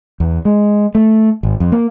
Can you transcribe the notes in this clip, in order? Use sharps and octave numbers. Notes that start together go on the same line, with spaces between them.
E2
G#3
A3
G#1
F2
A#3